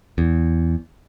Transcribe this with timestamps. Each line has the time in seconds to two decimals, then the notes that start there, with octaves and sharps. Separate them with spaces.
0.18 E2